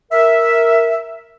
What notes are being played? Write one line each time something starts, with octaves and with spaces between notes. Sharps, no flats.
A#4 E5